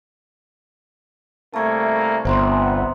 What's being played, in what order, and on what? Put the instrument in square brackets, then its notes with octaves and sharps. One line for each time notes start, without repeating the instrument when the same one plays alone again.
[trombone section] C2 A3 A#3 [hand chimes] A5 C#6 G#6
[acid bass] G1 [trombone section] C3 B3 [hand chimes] C5 A#5 C6